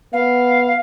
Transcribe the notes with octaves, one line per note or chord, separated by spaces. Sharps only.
B3 F5